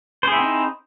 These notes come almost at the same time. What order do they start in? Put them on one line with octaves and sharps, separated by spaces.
C5 G#4 E4 C4 D#4